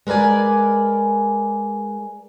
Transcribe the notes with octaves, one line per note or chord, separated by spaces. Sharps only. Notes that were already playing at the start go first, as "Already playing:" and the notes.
G#3 A#4 B4 D5 G#5